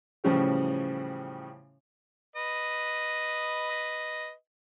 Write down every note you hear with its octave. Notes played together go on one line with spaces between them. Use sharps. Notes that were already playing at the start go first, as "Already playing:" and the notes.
A2 C#3 E3 F3 G3 C#4
B4 D#5